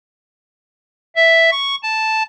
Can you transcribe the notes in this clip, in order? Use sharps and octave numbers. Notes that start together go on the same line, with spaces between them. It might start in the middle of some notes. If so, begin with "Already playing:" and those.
E5
C#6
A5